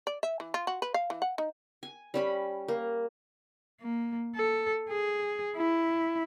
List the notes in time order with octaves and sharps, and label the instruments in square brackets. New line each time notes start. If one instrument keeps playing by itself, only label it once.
[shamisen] D5
E5
E3
F4
F#4
B4
F5
E3
F#5
D#4
[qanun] G#5
G3 C#4 B5
A#3
[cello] A#3
A4
G#4
E4